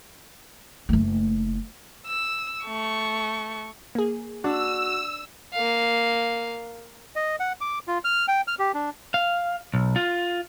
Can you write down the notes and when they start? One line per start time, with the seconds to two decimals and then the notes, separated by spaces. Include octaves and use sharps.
0.89 F#1 A3
2.07 E6
2.65 A3 C#6
3.95 A#3 G#4
4.44 D4 F#4 E6
5.54 A#3 F5
7.16 D#5
7.40 F#5
7.61 D6
7.88 F4
8.04 F6
8.28 G5
8.47 F6
8.59 G4
8.74 D4
9.14 F5
9.74 B1
9.96 F4